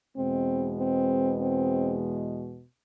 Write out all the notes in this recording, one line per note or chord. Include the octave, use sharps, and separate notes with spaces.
E2 B2 G#3 B3 C4
C4
C4